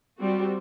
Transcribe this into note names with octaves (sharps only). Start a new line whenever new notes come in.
G3 C4 F#4